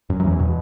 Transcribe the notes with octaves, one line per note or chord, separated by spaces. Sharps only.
F#2
F#3
E2 E3
B2